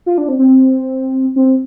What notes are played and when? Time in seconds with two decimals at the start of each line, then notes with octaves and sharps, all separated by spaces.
0.06 F4
0.18 D4
0.28 C4
0.39 C4
1.36 C4